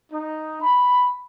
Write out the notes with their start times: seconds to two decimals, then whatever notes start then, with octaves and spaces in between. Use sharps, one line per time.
0.13 D#4
0.62 B5